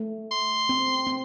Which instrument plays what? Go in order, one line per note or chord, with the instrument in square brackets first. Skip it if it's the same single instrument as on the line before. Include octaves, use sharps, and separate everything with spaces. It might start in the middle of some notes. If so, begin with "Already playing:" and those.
Already playing: [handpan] A3
[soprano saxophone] C6
[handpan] C4
C4